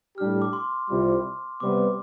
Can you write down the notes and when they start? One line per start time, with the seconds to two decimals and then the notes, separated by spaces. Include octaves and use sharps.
0.17 A2 G3 D4 G4 F6
0.42 D6
0.53 C6
0.89 C2 C3 G3 C4 F4
1.60 C3 G3 B3 D6